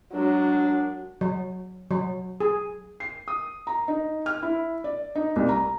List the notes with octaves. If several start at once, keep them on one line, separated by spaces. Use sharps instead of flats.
F#2 F#3 G#3 D4
F#3
F#3
G#4
C7
D#6
A#5
D#4
F6
E4
D5
D#4
C2
A#5